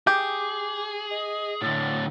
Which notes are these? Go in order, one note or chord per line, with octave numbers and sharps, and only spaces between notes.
G4 G#4 D6
D#5
A2 D3 A6